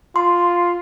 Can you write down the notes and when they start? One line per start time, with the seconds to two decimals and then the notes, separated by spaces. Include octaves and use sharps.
0.16 F4 C6